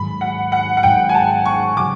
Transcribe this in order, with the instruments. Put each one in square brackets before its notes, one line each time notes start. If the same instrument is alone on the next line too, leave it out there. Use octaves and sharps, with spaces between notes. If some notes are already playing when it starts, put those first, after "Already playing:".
Already playing: [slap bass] G#2 D#3 F#3 [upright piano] B5
[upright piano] F#5
F#5
F#5
[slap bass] G#2 D#3 F#3 [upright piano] G5
[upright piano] G#5
A5
C#6
[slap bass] C#3 F#3 [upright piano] D6